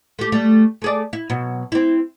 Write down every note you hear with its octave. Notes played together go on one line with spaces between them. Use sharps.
A3 G4
G3 A3
A3 G#4 D5
E4
B2 F#3
C4 E4